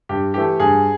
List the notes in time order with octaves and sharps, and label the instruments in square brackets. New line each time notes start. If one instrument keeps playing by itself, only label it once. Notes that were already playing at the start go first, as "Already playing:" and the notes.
[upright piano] G2 G4
E3 A3 G4
G2 G#4